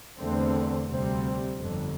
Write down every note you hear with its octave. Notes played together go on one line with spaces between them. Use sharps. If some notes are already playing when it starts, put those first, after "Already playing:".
E2 D3 A3 C4
D2 C3 G3 C4
G1 F2 D3